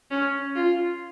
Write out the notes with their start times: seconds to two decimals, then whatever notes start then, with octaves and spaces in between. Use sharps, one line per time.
0.11 C#4
0.55 F4